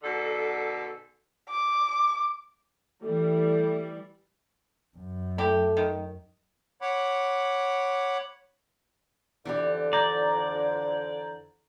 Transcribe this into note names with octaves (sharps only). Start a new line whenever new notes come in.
G#2 B2 D3 A4
D6
E3 G3 A3
F#2
A3 E4 G4
D#3
C#5 F#5 B5 D6
F2 D3 E3 D4 G4
D5 A#5 G6 G#6